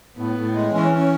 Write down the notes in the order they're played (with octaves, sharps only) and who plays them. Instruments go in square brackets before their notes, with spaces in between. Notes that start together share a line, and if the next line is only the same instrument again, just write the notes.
[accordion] A2 [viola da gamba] B3
[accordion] A2
G#3
[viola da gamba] E3 [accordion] C#4
[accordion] C#4